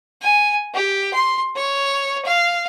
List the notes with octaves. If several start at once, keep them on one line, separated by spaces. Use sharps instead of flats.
G#5
G4
C6
C#5
F5